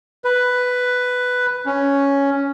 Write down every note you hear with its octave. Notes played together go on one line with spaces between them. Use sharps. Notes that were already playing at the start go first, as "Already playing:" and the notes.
B4
C#4